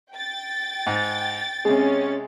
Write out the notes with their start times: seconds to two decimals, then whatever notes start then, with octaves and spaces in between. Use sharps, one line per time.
0.12 G5 A6
0.87 G#2
1.65 C3 G#3 C#4 G#4